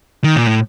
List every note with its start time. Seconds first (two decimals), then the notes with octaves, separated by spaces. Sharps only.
0.24 D#3
0.36 A#2
0.47 A2